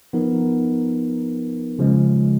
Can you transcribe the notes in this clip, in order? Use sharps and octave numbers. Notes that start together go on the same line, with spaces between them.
F3 B3 D#4 A#4
C#3 F3 G#3